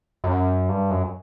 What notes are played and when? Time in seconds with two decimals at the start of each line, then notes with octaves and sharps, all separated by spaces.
0.24 F#2
0.69 G2
0.91 F#2